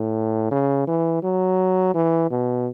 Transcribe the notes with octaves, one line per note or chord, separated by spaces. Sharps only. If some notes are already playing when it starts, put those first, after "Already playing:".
Already playing: A2
C#3
E3
F#3
E3
B2